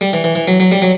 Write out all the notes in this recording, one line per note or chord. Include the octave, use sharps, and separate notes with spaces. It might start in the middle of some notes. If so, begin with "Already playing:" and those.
G3
E3
E3
E3
F#3
F#3
G3
F#3